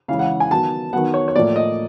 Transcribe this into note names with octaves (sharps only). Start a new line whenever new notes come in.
C#3 E3 G#3 F5
F#5
G#5
D#3 F#3 B3 A5
D#3 F#3 B3 F#5
C#5
C#5
A2 F3 A#3 D5
D#5